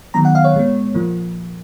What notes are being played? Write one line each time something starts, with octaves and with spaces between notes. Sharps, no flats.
D#3 F#3 B3 A#5
F#5
F5
C#5
A#2 G#3 B3
A#2 F3 A#3